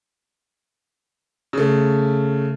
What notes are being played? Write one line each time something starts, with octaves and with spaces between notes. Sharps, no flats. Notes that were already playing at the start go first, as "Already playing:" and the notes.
C#3 A3